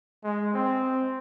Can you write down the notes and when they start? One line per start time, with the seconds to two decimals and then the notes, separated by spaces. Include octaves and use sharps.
0.24 G#3
0.53 C4